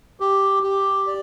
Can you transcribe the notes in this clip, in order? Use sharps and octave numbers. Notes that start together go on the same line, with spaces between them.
G4
G4
D5